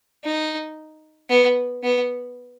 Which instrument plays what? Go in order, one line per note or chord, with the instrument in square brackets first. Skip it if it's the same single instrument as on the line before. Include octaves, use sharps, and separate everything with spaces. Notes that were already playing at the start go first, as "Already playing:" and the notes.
[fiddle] D#4
B3
B3